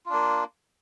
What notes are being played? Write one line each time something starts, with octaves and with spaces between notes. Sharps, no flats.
A#3 D4 F4